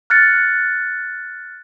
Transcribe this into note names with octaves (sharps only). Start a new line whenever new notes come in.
F6 F#6 A6 C#7